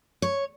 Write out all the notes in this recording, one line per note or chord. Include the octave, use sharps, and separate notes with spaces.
C#5